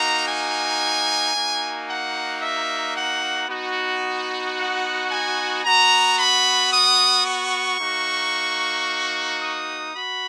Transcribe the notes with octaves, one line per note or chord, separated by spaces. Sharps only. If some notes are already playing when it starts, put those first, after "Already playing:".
Already playing: A#3 D#4 F#4 A#5
G#5
A#3 D#4 F#4
F#5
E5
F#5
B3 D#4 F#4
F#5
G#5
B3 F#4 A#5
B5
D#6
C#6
A#3 D#4 F#4
D#6
F#4 B5